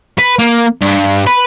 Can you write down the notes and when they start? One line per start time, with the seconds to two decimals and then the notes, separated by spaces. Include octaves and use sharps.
0.19 B4
0.39 A#3
0.81 G2
1.27 B4